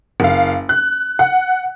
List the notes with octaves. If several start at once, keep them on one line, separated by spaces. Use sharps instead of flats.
F#1 F5
F#6
F#5